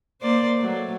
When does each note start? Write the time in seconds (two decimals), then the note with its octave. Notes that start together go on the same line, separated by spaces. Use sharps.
0.22 A#3 C5 D5
0.58 F#3 A3